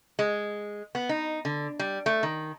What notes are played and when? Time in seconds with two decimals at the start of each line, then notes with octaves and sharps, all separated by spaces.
0.19 G#3
0.95 B3
1.09 D#4
1.45 D3
1.79 G3
2.06 A3
2.23 D#3